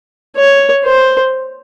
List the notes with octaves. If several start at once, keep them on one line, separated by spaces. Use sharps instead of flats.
C#5
C5